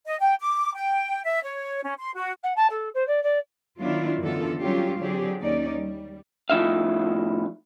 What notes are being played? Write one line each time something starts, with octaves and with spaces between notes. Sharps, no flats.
D#5
G5
D6
G5
E5
C#5
C#4
C6
F#4
F#5
A5
A4
C5
D5
D5
D#3 F#3 B3 D4 E4 F4
F#2 D3 E3 B3 F4 A4
F#3 G3 C#4 F4 G4
D3 F#3 C4 D4 G4 G#4
D#2 C#4 D#4 D5
G3
A2 F3 D#4 E5 F5